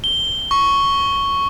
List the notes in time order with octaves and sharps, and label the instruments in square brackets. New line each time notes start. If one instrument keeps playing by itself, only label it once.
[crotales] G7
C#6